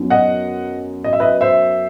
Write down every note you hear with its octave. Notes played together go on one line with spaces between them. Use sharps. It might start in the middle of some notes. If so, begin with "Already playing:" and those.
Already playing: F#2 F#3 B3 D#4
D#5 F#5
D#5
E5
B4 D#5
C5 E5